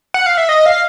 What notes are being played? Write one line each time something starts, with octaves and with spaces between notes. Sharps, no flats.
F#5
F5
E5
D#5
F5